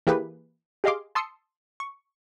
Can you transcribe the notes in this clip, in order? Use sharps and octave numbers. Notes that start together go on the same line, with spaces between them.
E3 A#3 G4 G#4 B4
G4 G#4 D#5 F5 C6 D6
A5 C6 D#6 E6 C7 C#7
C#6